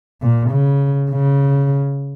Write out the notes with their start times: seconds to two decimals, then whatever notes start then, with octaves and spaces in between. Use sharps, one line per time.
0.22 A#2
0.51 C#3
1.11 C#3